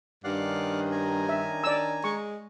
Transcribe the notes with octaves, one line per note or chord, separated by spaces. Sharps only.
G2 D#3 C#4 D4 D5 F5 F#5
G#5 A#5
E5
D5 E6
G#3 C#6